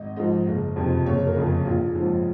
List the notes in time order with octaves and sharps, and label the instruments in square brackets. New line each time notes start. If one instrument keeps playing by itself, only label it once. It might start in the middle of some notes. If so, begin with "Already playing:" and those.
Already playing: [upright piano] G#1 D#5
G#2 F3 D#5
F#1
F2 C3 F3
F#1 C#5
A#4
F2 C#3
A#1 F4
G#2 F3